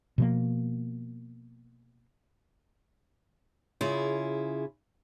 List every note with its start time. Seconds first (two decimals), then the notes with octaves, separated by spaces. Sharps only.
0.18 B2 F3 A#3
3.81 C#3 E4 F4 G#4